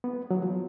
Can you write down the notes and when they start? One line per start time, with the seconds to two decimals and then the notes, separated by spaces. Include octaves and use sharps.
0.04 B3
0.31 F#3
0.42 F3